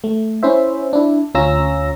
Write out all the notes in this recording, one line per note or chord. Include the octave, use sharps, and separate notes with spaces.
A3
C#4 E4 C5 E5
D4 E4
D2 C#4 F4 A#5 E6 A#6